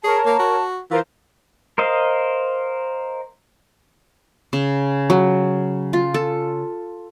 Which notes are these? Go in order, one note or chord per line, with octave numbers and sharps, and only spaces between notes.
G#4 A#4 C#5 A5
A#3
F#4
E3 F4 A#4 C5
A#4 C5 D#5 F5
C#3
F#3
F4
A4